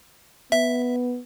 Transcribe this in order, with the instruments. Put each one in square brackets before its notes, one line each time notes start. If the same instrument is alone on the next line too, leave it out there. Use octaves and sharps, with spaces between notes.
[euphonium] B3 [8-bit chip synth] E5